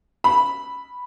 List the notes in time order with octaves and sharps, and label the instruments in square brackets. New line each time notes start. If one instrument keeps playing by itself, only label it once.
[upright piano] B5